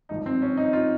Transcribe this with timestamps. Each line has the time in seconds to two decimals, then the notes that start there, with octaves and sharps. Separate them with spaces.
0.09 G#1 G2 F3 D#4
0.26 C4
0.42 C#4
0.57 D#4
0.73 F4